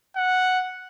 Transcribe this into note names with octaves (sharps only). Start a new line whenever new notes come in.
F#5